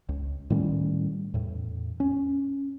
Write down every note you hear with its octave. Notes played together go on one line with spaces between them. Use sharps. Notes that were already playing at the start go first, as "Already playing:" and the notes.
C#2
A2 D#3 G3 C#4
E2 A2
C#4